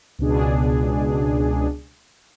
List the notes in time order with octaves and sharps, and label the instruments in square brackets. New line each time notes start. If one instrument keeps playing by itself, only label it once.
[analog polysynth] C#2 B2 D4 G#4